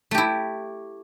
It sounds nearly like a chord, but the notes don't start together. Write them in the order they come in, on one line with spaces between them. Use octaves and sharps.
A3 G4 E4